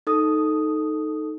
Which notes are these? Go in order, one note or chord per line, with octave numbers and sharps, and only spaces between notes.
D#4 A4 D#6